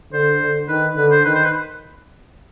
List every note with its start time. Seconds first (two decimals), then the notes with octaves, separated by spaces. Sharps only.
0.12 D3 C5
0.41 D3
0.68 D#3 B4
0.96 D3 B4
1.11 C5
1.25 D#3 B4
1.35 C5
1.44 B4